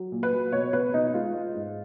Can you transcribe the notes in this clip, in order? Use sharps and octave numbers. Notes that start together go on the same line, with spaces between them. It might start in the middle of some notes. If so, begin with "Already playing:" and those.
Already playing: F#3
A#2
B4
F#3
B2 C#5
B2 B4
B2 D#4
G#3 F4
G#3
G#2